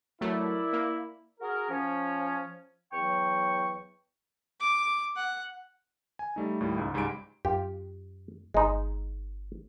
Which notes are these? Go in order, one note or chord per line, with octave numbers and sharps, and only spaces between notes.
F#3 A3 E4 A#4 D5
A#3
F#4 G#4 A#4
F3 C#4
E2 F#3 G5 C#6
D6
F#5
G#5
G3 A3 D#4
D#2 A2 G3
C#2 G#2
C#2 G#2 G3 G#5 B5 D7
F#2 F4 G4
G1 G#3 D#4